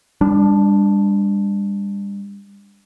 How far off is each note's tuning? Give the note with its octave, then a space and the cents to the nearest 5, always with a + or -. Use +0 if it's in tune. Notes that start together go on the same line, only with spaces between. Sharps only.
G3 +35 D4 -5